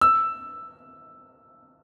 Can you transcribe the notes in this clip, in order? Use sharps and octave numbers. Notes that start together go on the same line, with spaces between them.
E6